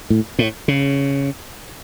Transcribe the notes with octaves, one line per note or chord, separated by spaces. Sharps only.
A2
A2
C#3